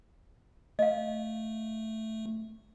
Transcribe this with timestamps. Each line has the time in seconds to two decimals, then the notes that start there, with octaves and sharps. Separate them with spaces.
0.79 A3 D#5 F5